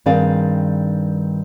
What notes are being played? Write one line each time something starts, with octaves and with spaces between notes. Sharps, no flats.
G2 D#3 C4 G#4 D5 F5